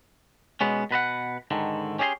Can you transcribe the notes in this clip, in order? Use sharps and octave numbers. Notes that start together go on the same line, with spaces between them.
B2 G#3 B3 C#4
B2 B4 D#5 F#5
G#2 D3 D#3
C#4 G4 G#4 D#5 C6